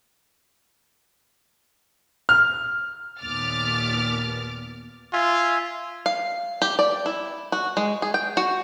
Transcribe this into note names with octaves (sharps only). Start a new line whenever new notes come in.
F6
D#2 A#2 B3 D6 F6 A6
F4 E5 G#5
F5
G4
D5
E4
F#4
G#3
G#4
G5
F#4